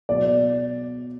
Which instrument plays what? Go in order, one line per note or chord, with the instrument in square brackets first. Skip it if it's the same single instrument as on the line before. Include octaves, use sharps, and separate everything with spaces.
[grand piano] B2 F#3 D5